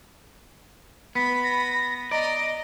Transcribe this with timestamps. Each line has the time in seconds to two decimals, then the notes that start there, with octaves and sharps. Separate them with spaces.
1.15 B3 B5 B6
1.44 A#6
2.11 D5 D#5 A#5